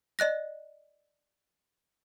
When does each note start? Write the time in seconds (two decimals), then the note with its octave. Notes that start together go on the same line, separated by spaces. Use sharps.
0.19 D5 D#5 F#6 A#6